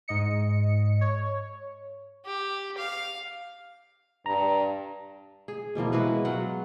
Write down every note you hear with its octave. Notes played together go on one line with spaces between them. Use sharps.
G#2 D#5 C#7
C#5
G4
F5
G2 A#5
G#4
B2 E3 F3 A#3
G#3 E4 F#4 B4
F#3 F4 F#5